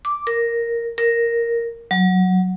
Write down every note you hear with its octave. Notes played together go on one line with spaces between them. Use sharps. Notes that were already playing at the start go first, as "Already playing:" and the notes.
D6
A#4
A#4
F#3